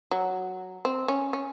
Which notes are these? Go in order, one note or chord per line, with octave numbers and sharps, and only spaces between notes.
F#3
C4
C#4
C#4